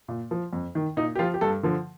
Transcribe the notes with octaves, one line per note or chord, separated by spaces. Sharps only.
A#2
F3
F2
D#3
A#2 D#4
G4
F3 F4
G4
G2 A4
D3 F3